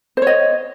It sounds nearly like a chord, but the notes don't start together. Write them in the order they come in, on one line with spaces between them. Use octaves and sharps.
C5 C#5 D#5